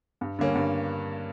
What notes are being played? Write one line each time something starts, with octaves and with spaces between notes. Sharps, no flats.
G2
D3 G3 A#3 C#4
G2